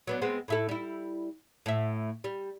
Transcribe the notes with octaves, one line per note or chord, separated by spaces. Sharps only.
F#3 B3 D4
G#3 B3 C4
A2 E4 A4
G3 E4
A2 E5
G3